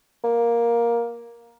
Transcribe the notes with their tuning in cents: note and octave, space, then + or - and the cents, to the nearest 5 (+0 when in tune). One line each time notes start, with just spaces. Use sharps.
A#3 +10